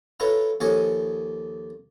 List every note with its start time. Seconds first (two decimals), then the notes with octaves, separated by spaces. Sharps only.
0.20 F4 A4 B4 C#5 E5 A#5
0.60 D#2 F3 A4 C#5 D#5 G#5